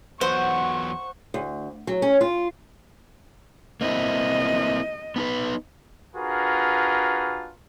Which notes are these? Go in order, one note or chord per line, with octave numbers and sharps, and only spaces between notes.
E2 F#3 B3 C5 F#5 C#6
D2
F#3
C#4
F4
A#3 C4 E4 D#5
B3 D#4 B4
D4 F4 F#4 G#4 A#4 B4